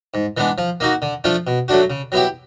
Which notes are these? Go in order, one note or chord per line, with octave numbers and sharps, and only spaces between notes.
G#2
E3 G#3 B3 D4
F3
A#3 D#4 F#4
D3
F3 A3 D4 F4
B2
F#3 A3 D4 F#4
C#3
F#3 B3 E4 G4